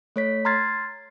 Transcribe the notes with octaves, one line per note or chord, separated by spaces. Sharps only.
A3 C#5 B6
A#5 C6 F6 G#6 A6 C7